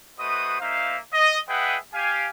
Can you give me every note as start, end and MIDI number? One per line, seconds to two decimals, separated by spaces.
0.19 0.57 57
0.19 0.57 66
0.19 0.57 71
0.19 0.57 72
0.19 0.57 75
0.19 0.57 87
0.61 0.97 58
0.61 0.97 63
0.61 0.97 72
0.61 0.97 76
0.61 0.97 77
1.14 1.40 75
1.49 1.77 68
1.49 1.77 71
1.49 1.77 75
1.49 1.77 76
1.49 1.77 78
1.49 1.77 79
1.94 2.29 67
1.94 2.29 77
1.94 2.29 80